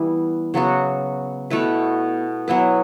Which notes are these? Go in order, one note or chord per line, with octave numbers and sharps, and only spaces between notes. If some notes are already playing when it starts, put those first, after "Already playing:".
Already playing: E3 G3 B3 E4
C#3 F#3 B3 F#4
B2 A3 E4 B4
F#3 B3 E4 B4